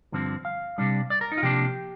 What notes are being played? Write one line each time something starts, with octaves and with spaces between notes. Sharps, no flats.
G2 D3 F3 C4
F5
C3 G3 D4
D5
A#4
D#4
F4
C3 F3 A#3 D4 G4